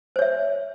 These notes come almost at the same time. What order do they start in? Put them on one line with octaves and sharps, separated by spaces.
C5 C#5 E5